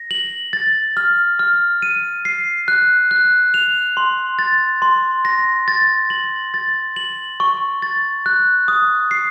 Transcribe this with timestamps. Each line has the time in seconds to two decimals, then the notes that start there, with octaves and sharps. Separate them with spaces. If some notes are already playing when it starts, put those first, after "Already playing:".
Already playing: A#6
0.11 F#7
0.53 A6
0.97 F6
1.39 F6
1.82 D#7
2.25 C7
2.68 F#6
3.11 F#6
3.54 F7
3.97 C6
4.39 A6
4.82 C6
5.25 A#6
5.68 A6
6.10 F#7
6.54 A6
6.96 F#7
7.40 C#6
7.82 A6
8.26 F#6
8.68 D#6
9.11 C7